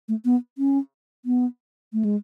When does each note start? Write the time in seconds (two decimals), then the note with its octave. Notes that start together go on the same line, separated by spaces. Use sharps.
0.08 A3
0.25 B3
0.58 C#4
1.25 B3
1.93 A3
2.05 G#3